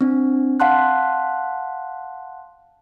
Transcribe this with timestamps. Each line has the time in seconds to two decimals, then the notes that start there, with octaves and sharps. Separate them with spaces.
0.01 C4 D4
0.60 F5 F#5 A5 C6 F#6